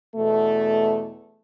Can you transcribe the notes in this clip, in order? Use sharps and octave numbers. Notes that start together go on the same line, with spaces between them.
E2 B2 A3